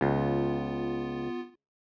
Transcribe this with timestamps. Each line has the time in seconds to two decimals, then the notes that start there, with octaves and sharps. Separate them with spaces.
0.01 C#2 B3 F4